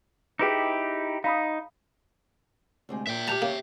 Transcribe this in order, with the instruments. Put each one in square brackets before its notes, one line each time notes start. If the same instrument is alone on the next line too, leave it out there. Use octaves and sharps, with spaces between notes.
[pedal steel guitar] D#4 E4 G4 [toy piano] G#4 B4 D6
[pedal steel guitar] D#4 [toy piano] F5 B5 D#6
[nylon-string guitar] D2 C3 G#3
[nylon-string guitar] A#2 [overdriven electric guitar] E5 G5
[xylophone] G4 G6 F7 [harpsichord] A5 A#5
[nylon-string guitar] C#3 C#5 [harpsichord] A#3